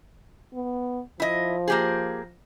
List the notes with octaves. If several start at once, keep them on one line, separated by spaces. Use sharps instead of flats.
B3
F3 E4 D#5
A#3 G4 G#4